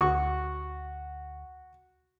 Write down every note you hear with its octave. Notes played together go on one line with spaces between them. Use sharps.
D2 F#4 C#6